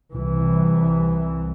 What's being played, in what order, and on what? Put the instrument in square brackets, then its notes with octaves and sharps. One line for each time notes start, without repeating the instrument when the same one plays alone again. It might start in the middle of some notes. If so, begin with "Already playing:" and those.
[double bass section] C2 E3